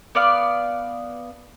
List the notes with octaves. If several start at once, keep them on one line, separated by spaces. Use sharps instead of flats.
B3 D5 F5